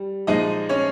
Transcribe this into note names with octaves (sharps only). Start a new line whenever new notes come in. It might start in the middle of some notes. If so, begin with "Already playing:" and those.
Already playing: G3
A#2 F3 G#3 D#4 D#5
C#4 C#5